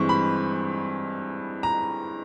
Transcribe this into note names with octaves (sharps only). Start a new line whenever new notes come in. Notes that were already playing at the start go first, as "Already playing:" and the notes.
Already playing: G2 E3 G#3 C4 C#6
B5
A#5